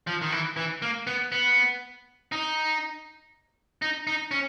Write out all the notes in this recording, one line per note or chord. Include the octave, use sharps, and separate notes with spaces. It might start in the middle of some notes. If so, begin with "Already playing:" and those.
F3
D#3
E3
E3
A#3
B3
B3
D#4
D#4
D#4
C#4